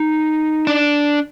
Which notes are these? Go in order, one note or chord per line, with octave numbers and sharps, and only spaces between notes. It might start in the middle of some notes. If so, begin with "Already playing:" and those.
Already playing: D#4
D4